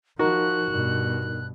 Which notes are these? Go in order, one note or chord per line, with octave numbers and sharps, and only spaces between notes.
F3 D#4 F#4 A#4 F#6
G2 B2